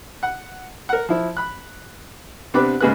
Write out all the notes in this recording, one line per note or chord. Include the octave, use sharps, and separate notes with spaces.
F#5
A#4 F#5
F3 E4
B5 F#6
C3 B3 C4 D4 B4 D6
G#2 C#3 A#3 G#4 B4 F#6